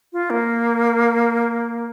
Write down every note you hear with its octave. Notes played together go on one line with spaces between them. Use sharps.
F4
A#3